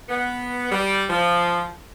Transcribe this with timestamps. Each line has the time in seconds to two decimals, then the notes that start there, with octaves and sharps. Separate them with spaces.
0.09 B3
0.70 G3
1.09 F3